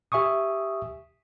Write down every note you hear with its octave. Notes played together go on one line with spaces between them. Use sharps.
G4 E5 G#5 C#6 D#6